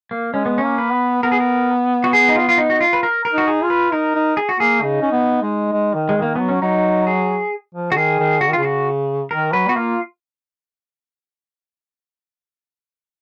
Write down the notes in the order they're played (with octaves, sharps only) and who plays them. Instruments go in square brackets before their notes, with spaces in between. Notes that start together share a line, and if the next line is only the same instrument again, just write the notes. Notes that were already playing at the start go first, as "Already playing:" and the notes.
[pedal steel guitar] A#3
[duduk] G#3 [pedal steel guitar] C#4
[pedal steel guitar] B3
C#4
[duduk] A#3
[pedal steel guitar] B4
[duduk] B3
[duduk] B3 [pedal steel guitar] A#4
[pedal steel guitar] G#4
A#4
F#4
G#4
D#4
F4
F4
D#4
F#4
F4
B4
A#4
A#4
[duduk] D#4
[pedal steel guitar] F#4
G#4
[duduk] F4
[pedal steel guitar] B4
[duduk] D#4 [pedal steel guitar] A#4
[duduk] D#4
[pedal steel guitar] G#4
F#4
[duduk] A#3 [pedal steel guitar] G#4
[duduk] C#3 [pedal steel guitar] D#4
[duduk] C#4
B3
G#3
G#3
D#3
[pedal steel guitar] G#3
[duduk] D#3
[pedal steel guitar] A#3
[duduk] F#3 [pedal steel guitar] B3
[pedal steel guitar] C#4
[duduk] F#3 [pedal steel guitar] D#4
[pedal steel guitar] G#4
[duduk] F3
[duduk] C#3 [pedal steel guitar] F#4
[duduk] D#3 [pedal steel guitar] G#4
[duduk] D#3
[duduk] C#3 [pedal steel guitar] F#4
[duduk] D#3
[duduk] C#3 [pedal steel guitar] F4
[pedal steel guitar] F#4
[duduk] D#3 [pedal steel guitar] A#4
[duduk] F#3 [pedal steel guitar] B4
[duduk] B3 [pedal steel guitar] F#4
[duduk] A#3 [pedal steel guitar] F4